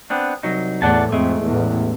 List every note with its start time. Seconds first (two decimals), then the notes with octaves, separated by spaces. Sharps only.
0.10 B3 C4 D4
0.43 C2 F#3 D#4
0.82 E2 A2 D5 F#5 A5
1.12 F2 G#3 A3
1.47 A1 E2